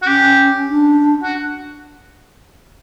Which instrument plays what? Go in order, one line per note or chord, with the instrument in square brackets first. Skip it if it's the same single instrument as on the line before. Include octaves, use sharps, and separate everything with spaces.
[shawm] F#4
[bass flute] C#4 [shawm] G4
[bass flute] D4
[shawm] F#4